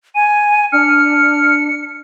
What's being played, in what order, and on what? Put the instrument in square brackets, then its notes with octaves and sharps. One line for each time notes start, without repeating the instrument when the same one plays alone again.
[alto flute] G#5 [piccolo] D#7
[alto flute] D4 [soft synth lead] F6 [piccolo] C#7